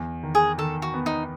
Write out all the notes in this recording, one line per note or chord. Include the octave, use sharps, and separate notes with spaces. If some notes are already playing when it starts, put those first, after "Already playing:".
Already playing: E2
D#3
G#4
D#3 A4
F#4
B3
D#4